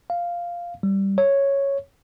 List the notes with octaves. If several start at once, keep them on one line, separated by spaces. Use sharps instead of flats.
F5
G3
C#5